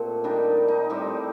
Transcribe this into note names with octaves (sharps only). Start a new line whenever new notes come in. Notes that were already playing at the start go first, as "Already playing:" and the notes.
Already playing: A#2 A3 C4
D#3 G3 D4 D#4
D#4
A2 G3 C4 G4